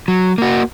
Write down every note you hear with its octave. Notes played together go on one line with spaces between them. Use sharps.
F#3
A#3 F#4